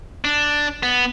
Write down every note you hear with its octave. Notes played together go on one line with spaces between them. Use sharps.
D4
B3